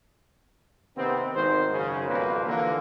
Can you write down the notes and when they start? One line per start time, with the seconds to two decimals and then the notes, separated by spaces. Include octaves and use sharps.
0.97 C3 D#3 B3 C4
1.36 G#1 D#3 C5
1.72 F#2 C#3
2.08 B1 F2 G3 A#3 B4 C5
2.47 D3 E3 F3 A#3